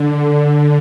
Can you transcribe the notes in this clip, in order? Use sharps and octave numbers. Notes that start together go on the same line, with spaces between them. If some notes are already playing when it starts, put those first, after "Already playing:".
Already playing: D3